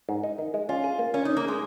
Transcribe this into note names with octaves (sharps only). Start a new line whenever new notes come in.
G#2
D#4
D#3
G#3
C#4 F4
G#4
A#3
C#4 C#5
C#4 D#4
A#3
G#3 G#4